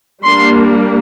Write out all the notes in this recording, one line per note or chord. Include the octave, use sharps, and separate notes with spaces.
G3 A#3 D4 C6